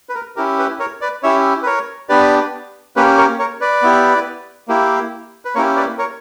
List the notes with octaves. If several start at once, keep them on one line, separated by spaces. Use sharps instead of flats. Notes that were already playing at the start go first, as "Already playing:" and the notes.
B4
A#4
C#4 E4 G4 A#4
B4
A#4 C#5
B4 D5
C#4 E4 G4 C#5 E5
B4
A#4 C#5
B3 D4 G4 B4 D5
A#3 C#4 G4 B4
A#4 C#5
A#4 C#5
B4 D5
B3 E4 G4
A#3 E4 G4
B4
A#3 C#4 E4 G4 A#4 C#5
B4 D5
A#4 C#5